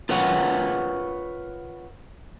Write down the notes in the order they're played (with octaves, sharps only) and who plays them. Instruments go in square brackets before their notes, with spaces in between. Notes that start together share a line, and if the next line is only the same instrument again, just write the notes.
[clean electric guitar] F4 A#4 B4 C#5 F5 F#5